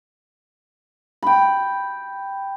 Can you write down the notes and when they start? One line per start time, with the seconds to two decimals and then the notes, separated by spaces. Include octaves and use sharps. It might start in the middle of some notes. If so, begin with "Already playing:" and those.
1.22 G5 B5